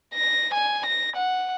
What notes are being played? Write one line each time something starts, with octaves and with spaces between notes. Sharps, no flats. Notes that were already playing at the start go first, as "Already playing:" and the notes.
A#6
G#5
A#6
F#5